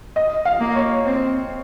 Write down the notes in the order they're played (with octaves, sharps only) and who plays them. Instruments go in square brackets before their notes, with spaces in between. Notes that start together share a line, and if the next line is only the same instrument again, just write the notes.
[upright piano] D#5
F5
[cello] A#3
[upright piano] C#5
[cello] C4